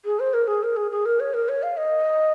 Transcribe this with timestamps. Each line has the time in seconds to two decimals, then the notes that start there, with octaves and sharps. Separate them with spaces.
0.05 G#4
0.20 C5
0.34 A#4
0.48 G#4
0.63 A#4
0.76 G#4
0.91 G#4
1.06 A#4
1.20 C#5
1.34 A#4
1.49 C#5
1.63 F5
1.77 D#5